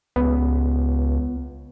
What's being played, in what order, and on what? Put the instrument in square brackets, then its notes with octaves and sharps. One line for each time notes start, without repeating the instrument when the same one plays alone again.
[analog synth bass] C#2 [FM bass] B3